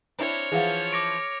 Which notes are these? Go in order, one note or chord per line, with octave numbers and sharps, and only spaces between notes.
C4 D4 E4 C#5 F6
E3 F3 G#4 F5 F#5
C#6 D6 A#6 D7